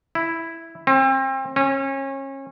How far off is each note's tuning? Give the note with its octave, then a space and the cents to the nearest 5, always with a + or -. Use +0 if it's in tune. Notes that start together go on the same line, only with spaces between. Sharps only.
E4 +0
C4 +35
C#4 -30